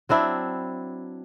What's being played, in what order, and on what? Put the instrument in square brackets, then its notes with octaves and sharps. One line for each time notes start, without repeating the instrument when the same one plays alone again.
[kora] F#3 C4 D4 E4